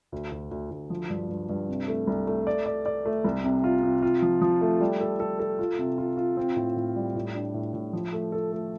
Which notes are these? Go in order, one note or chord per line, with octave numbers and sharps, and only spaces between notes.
D2
D2
D2
D2
F3
G2
G2
G2
C3
A3
C2
A3
D5
D5
D5
A3
C2
C3
F4
C3
F4
F3
F3
A3
G3
A4
A4
A4
F4
C3
F4
F4
C4
A2
A2
G3
A2
D4
A2
A2
F3
A3
A4
A3